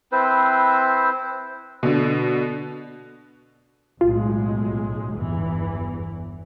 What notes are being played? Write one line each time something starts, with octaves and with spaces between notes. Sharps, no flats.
C4 E4 B4 C5
B2 D3
B1 A2 G#3 F4
G1 E2 E3